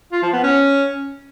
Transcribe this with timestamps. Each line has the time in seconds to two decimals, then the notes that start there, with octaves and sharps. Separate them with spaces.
0.12 F4
0.23 F3
0.33 B3
0.43 C#4